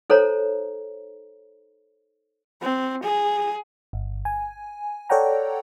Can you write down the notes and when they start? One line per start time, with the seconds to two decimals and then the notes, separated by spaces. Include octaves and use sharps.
0.10 D#4 A4 C5 C#5 A#5
2.62 C4
3.03 G#4
3.93 G1
4.25 G#5
5.10 A4 C#5 D5 F#5 G5 A#5